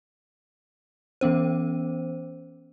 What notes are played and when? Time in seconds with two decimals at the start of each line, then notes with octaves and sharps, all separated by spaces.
1.21 E3 B3 C#4 C5